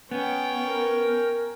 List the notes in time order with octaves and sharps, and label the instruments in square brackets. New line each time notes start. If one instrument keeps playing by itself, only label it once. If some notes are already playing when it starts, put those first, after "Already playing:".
[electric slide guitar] B3 [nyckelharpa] C#4 G5
[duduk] A#4